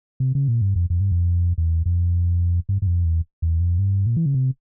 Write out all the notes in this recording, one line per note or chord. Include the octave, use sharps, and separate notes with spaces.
C3
C#3
A#2
G2
F2
F2
G2
F2
E2
F2
G2
G2
F2
E2
E2
F2
G2
A#2
E3
C#3
C3